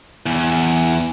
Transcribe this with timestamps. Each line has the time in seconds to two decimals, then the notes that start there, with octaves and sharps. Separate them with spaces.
0.26 E2